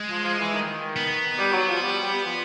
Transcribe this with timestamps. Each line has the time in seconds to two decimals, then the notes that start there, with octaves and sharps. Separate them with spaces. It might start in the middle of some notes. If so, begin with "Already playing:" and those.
Already playing: G#3
0.10 F3
0.24 F3
0.39 E3
0.53 D#3
0.96 B3
1.39 G3
1.53 F#3
1.68 F3
1.82 G3
2.03 G3
2.25 F3